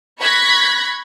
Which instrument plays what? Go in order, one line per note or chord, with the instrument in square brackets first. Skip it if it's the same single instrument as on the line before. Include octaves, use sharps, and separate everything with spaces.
[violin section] B5 C#6 F#6 G#6 A#6 B6